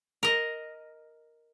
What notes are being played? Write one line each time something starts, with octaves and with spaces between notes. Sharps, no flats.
A#4 D#5